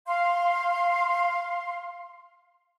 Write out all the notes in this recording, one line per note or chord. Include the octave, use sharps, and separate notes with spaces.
F5 C6